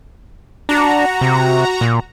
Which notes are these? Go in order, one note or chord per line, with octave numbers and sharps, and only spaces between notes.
D4 F#4 A#5
C3
A#2